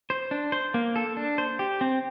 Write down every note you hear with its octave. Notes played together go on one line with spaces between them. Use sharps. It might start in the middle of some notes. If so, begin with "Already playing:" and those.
C5
D4
C5
A#3
A4
D4
C5
G4
C4